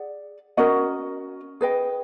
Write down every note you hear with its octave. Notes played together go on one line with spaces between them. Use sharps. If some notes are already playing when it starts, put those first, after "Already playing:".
Already playing: G#4 D5 F#5
C#4 F#4 A#4 D#5
G#4 B4 D#5 G5